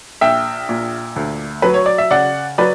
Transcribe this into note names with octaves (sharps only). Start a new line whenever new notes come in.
A#1 E5 G5
A#2
D2
F#3 B4
C#5
D5
E5
C#3 D5 F#5
F#3 B4 D5